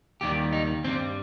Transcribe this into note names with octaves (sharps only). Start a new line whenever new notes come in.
D#2 D#3 G3 G4
D#4
G2 G3 C4